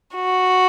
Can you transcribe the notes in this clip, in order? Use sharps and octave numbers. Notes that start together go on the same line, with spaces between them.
F#4